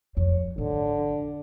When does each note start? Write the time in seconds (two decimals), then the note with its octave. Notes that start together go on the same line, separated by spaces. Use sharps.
0.17 F2 C#5
0.58 G#1 D3